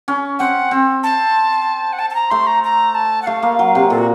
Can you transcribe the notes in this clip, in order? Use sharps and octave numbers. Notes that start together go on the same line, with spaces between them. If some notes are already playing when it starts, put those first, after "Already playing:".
C#4
C4 F#5
C4
A5
F#5
A5
A5
A#5
A3 C6
A#5
A#5
A5
F#5
A3 F5
A#3
F#3
C3
A#2 A4
F#4